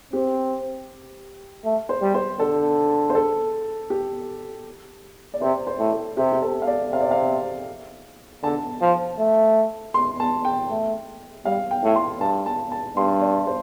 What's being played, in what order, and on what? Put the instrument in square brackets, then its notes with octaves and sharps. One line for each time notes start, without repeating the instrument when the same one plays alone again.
[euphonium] C4 [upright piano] G4
[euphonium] A3
[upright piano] C5
[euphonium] G3
[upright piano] C5
[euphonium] D3 [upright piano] A4
[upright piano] C5
A4
G4
D5
[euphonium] C3 [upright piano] C5
[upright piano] C5
[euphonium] A2
[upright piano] A4
[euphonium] C3 [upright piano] G4
[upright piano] G4
A4
F5
D5
[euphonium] C3 [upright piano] F5
[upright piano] D5
F5
[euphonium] D3 [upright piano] A5
[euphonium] F3
A3
[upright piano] C6
A5
G5
[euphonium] A3
[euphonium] G3 [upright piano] F5
[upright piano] G5
[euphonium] A2
[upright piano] C6
[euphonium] G2 [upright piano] A5
[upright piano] A5
A5
[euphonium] G2 [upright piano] C6
[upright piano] D5
C5